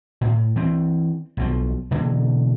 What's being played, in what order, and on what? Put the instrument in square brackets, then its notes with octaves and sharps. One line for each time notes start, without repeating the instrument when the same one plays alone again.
[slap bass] A2
E3 C4
B1 B2 F3
B2 D3 E3 A#3